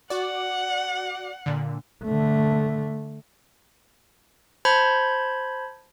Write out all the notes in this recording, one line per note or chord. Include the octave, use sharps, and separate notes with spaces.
F#4 D5 F#5
A#2 D3
D3 A3
C5 A5 B5 G6 G#6